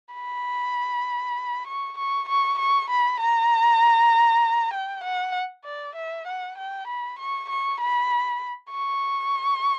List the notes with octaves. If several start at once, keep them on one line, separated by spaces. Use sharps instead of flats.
B5
C#6
C#6
C#6
C#6
B5
A#5
G5
F#5
D5
E5
F#5
G5
B5
C#6
C#6
B5
C#6